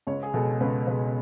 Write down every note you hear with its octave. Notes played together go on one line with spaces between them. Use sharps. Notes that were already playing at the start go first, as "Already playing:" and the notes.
C#2 C#5
G#4
B2 G#3 A4
C#2 B4
B2 G#3 B4